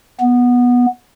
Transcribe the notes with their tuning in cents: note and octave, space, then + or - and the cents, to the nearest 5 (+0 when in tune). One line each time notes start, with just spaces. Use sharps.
B3 -10